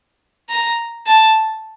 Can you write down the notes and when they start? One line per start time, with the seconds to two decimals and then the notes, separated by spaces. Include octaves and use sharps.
0.49 A#5
1.06 A5